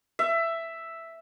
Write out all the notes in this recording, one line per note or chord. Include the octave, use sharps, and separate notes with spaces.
E5